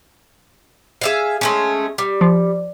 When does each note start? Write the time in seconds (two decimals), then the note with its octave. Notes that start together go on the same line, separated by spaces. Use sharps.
1.02 G#4 E5 F5
1.41 G#3 A3 C#4
1.98 G3
2.21 F3